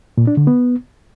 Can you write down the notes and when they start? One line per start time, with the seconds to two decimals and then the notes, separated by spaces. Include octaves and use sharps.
0.18 A#2
0.27 D4
0.37 D3
0.47 B3